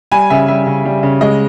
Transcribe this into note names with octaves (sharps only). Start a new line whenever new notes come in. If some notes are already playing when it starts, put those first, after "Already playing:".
G3 G#5 B5
C#3 E5 G#5
G3 E5
C#3
G3
C#3
G#3 D#5